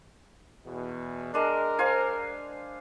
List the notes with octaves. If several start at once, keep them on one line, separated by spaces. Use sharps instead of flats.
E2 B2
G#3 D4 A#4
C5 F5 G#5